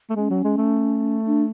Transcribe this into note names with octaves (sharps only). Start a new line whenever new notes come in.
A3
G#3 C#4
F#3
G#3
A3
D4